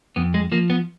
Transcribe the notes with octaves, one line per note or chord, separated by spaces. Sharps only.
F2 B3
G#3
F3 A#3
B3